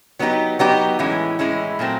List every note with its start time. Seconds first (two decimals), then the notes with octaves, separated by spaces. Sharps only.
0.19 F#3 B3 D#4 G4
0.59 F#3 B3 D#4 G4
0.99 A2 E3 G#3 C#4 E4
1.39 A2 E3 G#3 C#4 E4
1.79 A#2 F#3 A3 C4